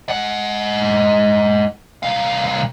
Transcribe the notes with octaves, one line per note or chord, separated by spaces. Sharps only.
G#3 F#5
C2 F5